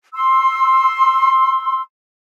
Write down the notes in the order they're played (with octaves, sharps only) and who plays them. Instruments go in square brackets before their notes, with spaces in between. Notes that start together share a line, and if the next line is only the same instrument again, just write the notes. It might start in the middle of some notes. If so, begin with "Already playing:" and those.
[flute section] C6 E6